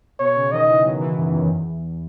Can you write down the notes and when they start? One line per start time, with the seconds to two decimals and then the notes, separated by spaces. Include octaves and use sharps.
0.19 B2 C#5
0.35 C#3
0.52 D#3 D#5
0.69 E3
0.84 F#3
1.00 E3
1.17 F#2
1.32 E2
1.49 E2